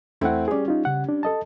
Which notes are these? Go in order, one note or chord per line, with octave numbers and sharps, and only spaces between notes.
E2 A3 C4 E4 F#5
G3 C#4 G#4 D5
D#4 F4
C#3 F#5
D4
A4 D#5 A5